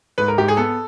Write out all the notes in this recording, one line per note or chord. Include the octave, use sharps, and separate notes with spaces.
G#2 B4
A#4
G#2 G4
G#4
B3 A4